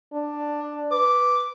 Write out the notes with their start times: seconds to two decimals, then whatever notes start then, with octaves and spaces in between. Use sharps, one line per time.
0.13 D4
0.92 B4 D6